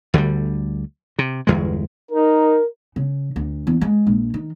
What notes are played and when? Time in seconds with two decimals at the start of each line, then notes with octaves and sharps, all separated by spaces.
0.14 D2 D3 F#3 G3
1.19 C3
1.47 G1 E2 G#3
2.11 D#4 A#4
2.96 C#3
3.36 D2
3.67 E2
3.81 G#3
4.07 A#1
4.34 D#3